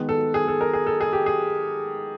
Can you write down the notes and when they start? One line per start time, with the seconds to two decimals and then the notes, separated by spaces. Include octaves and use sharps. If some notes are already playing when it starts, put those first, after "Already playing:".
Already playing: D#3 G#3 B3
0.09 A4
0.34 G#4
0.48 A4
0.61 A#4
0.73 G#4
0.87 A4
1.01 G#4
1.13 G4
1.26 G#4